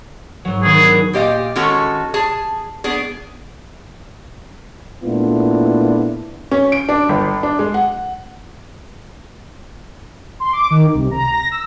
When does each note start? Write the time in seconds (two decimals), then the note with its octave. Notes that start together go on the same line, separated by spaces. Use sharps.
0.45 G#2 F#3
0.63 D#3 B3 G#4
0.79 D4
1.13 A#2 G4 D#5 F5
1.56 D#3 G#3 C#4 F#4 A4
2.14 G#4 A5
2.84 B3 D4 G#4
5.03 A#2 A3 B3 D4 E4 F4
6.51 C#4
6.72 D7
6.89 D4
7.09 G1
7.43 D4
7.59 G#3
7.74 F#5
10.40 C6
10.53 D6
10.70 D#3
10.94 C2
11.11 A#5
11.31 A#6
11.51 E6